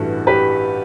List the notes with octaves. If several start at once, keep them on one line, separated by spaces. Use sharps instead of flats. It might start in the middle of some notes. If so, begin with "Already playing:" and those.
Already playing: A1 G2 E3 A3 F#4 A4
G4 B4